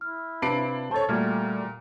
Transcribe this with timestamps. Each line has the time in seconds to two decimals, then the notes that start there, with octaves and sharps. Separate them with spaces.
0.01 E4 F6
0.42 C3 D4 B4 F5 A#5 B5 C7 D7
0.91 A4 C5 C#5 A5 C#6 A6
1.09 A#2 G3 A3 F#4 F6 G#6 A6